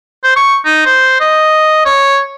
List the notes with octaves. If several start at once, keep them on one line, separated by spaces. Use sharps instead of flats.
C5
C#6
D#4
C5
D#5
C#5